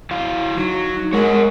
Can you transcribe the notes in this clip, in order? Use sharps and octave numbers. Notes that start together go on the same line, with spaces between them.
F#3 E4 F5
F#3 D#4
G#3 A#4 C#5 D#5 F#5